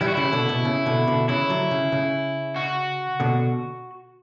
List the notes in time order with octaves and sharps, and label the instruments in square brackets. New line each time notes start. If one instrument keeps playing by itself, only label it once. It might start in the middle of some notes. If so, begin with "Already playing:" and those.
[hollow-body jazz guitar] E3 G3 [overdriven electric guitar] E4
[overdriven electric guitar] F#4
[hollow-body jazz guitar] C#3 E3 [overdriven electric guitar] E4
[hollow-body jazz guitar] B2 D3
B2
C#3
B2 D3
B2 D3
[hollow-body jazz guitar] C#3 E3 [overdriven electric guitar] E4
[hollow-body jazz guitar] D3 F#3
C#3
C#3
[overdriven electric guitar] F#4
[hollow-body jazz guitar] B2 D3